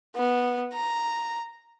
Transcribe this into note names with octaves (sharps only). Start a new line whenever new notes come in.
B3
A#5